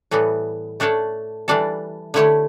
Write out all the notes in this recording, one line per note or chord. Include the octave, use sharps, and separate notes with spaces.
A2 E3 G3 B3
A3 D4 A4 C#5
E3 G3 D4 A4 D5
D3 A3 E4 G4 C#5